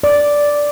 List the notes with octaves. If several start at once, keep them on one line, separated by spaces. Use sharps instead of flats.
D5